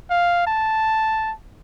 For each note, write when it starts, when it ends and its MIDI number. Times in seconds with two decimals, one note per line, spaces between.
0.10 0.46 77
0.47 1.32 81